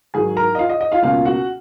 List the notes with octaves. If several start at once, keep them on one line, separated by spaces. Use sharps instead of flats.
G#2 D#3 F#3 G#4 G#5
A#4 A#5
D#5
F4 F5
D#5
D#5
F4 F5
C#2 B2 A#3 C#4 F4 F5
F#4 F#5